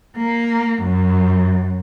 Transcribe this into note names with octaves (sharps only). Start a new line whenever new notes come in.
A#3
F#2